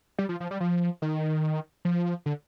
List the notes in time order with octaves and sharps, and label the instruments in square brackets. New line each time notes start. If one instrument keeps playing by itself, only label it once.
[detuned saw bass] G3
F3
F3
G3
F3
D#3
F3
D3